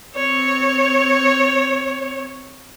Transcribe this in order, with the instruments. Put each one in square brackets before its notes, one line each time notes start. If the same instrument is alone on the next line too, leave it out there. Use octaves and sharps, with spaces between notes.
[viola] C4 C#5